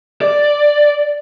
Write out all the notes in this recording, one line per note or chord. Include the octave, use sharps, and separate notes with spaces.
D5